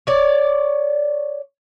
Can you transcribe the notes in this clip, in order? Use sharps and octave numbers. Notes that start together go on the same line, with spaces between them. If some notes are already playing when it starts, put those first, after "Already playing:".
C#5 D5